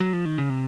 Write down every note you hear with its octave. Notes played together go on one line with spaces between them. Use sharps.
F#3
F3
D#3
C#3
C3